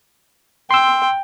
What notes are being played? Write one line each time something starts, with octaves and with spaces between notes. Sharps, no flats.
G5 C6 E6